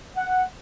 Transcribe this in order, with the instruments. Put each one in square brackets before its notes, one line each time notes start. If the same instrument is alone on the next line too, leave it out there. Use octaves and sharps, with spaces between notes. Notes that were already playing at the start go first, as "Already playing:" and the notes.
[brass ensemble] F#5